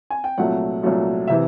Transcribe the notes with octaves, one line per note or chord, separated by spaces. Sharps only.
G#5
G5
C2 A#2 F#3 A3 F#5
C2 A#2 F#3 A3
C3 E3 E5